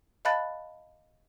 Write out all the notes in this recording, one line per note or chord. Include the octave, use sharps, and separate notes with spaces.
D#5 F5 A5 B5 F#6 A6